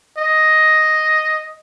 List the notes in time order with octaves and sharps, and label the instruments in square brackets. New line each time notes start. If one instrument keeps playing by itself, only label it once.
[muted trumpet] D#5